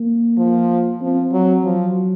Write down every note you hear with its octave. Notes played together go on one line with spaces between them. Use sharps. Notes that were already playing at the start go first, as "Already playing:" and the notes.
Already playing: A#3
F3
F3 C4
F#3
F3 F#3